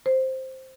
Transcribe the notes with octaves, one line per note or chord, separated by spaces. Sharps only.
C5